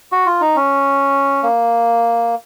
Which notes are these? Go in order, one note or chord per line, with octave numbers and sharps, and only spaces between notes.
F#4
F4
D#4
C#4
A#3